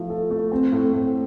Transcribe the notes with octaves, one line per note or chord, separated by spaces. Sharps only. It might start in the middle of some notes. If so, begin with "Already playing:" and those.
Already playing: F3 A3 E4
A4
A3
C4
A2
A2